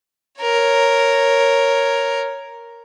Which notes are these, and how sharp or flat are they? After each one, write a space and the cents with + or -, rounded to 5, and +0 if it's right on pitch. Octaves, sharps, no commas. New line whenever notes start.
A#4 +0 C#5 -5